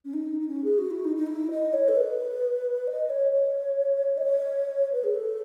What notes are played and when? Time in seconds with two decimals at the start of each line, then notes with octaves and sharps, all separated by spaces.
0.05 C#4
0.14 D#4
0.40 D#4
0.48 C#4
0.64 G#4
0.78 F#4
0.91 E4
1.04 D#4
1.16 D#4
1.27 E4
1.50 D#5
1.73 C#5
1.88 A4
1.95 B4
2.87 D#5
3.10 C#5
3.32 C#5
4.18 D#5
4.24 C#5
4.92 B4
5.04 G#4
5.15 A4